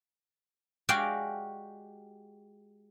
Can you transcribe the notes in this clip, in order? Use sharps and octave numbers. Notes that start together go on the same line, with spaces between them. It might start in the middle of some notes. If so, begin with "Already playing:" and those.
G#3 F#4 G4 D5 F5 G5